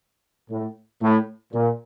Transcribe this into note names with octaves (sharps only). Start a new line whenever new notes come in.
A2
A2
A#2